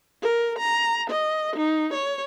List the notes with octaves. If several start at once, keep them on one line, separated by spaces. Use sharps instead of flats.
A#4
A#5
D#5
D#4
C#5